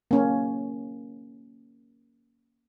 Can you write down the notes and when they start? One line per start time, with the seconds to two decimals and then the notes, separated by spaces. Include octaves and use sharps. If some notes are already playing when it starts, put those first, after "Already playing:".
0.11 A#3 C#4